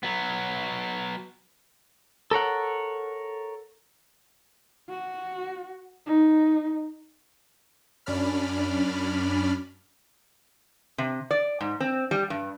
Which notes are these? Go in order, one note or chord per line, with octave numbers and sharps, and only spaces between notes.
F#3 B3
A4 A#4 C#5 F#5
F#4
D#4
F#2 C#4 D4 D5 B5 F6
C3
D5
G#2
C4
G3
G2